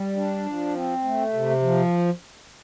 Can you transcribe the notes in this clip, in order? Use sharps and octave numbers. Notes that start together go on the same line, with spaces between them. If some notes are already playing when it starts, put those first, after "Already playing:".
Already playing: G3
D4
F3
C4
A3
C3
F3